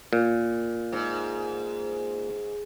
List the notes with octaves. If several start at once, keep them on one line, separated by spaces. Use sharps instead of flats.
A#2
G#2